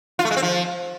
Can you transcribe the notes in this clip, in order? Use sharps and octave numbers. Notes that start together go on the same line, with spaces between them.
F4
A3
G#3
C4
F3